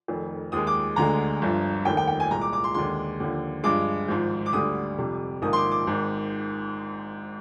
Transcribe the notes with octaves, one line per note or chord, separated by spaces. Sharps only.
F1 F2 D#3
D#2 D#3 G#3 D#6
D6
D2 D3 G#3 A#5
G1 G2 F3
F1 D#2 D#3 G5
G5
G5
G#5
C2 A#2 G#3 A#5
D6
D6
C6
D#2 D3 G#3 C6
D#2 D3 F3
G2 F3 G#3 D6
G#1 G#2 F3
D6
D2 D3 G3 D#6
F2 C3 G3
A#1 G#2 D#3 A#3 D#6
C6
D6
D6
G#1 G#2 D#3